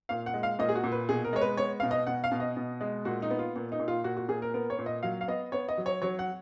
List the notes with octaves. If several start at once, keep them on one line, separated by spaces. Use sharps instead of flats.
A#2 F5
F#5
G#3
F5
A#2 D#5
G#4
F#4
A#2
B4
B2 G#4
A#4
G#3 C#5
B4
B3 C#5
B2 F5
D#5
B2 F#5
F5
B2
D#5
B2
G#3
A#2 F#4
D#4
B3
F4
A#2
D#4
A#2
F4
A#2 F#4
F#4
A#2 G#4
A#4
B3 A#4
C#5
A#2
D#5
F#3 F5
F5
B3 D#5
B3 C#5
D#5
F#3
C#5
F#3 C#5
F#5